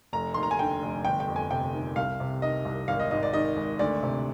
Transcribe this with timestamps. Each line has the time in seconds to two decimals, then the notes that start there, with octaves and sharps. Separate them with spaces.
0.13 F1 A#5
0.34 D#2 C6
0.43 A#5
0.51 G#5
0.59 D3 G5
0.82 F1
1.05 G1 G5
1.20 G5
1.28 F2
1.36 G#5
1.50 C3 G5
1.73 D#3
1.96 C2 F5
2.20 C3
2.42 D#3 D#5
2.65 C2
2.88 G#1 F5
3.00 D#5
3.11 G#2 D#5
3.23 D5
3.33 D#3 D#5
3.57 G#1
3.79 D2 D5
4.03 C3